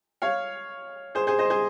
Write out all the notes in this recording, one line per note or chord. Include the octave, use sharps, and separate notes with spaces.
C#5 F5
G#4 C5
G#4 C5
C5 D#5
G#4 C5